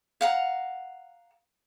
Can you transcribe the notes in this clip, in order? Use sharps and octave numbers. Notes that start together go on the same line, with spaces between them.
F5 F#5 A#5